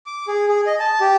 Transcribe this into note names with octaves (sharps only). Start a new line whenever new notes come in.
D6
G#4
G#4
D#5
A5
G4